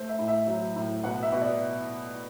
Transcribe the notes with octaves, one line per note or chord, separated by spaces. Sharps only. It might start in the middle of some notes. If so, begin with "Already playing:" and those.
Already playing: A3 C5
E5
A2
E5
F#3
A2
B2 F#5
E5
B2
D5